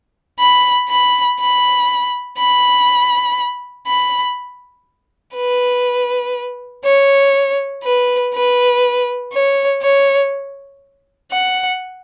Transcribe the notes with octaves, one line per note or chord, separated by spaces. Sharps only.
B5
B5
B5
B5
B5
B4
C#5
B4
B4
C#5
C#5
F#5